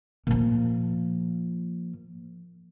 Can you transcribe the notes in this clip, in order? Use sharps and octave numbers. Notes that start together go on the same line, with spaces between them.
A#2 F3